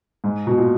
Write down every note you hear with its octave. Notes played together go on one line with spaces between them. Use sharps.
G#2
B2
A#2